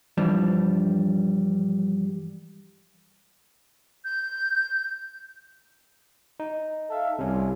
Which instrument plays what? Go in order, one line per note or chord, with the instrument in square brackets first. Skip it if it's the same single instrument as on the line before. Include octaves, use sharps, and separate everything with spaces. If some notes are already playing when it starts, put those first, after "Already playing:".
[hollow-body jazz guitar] G2 E3 F3 G3 D4
[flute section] G6
[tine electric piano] D#4
[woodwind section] A4 E5 F5
[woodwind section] C2 [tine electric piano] C3 C#4